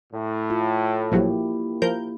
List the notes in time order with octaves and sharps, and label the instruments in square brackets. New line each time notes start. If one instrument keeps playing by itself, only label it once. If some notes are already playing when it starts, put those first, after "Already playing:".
[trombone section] A2
[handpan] F4
[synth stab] A#1 F3 F#3 [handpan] A#3 E4 G4
[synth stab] F3 A#4 G6